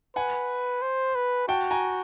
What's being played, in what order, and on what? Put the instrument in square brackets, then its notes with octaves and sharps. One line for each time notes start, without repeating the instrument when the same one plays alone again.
[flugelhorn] B4 [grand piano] F#5 G#5
[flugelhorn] C5
B4
[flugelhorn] F#4 [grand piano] G5 A5
[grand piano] G#5 A#5